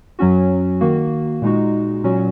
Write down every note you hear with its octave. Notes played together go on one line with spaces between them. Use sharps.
F#2 F#3 C#4 F#4
D#3 A#3 F#4
A#2 G#3 D#4 F#4
A#2 F#3 C#4 F#4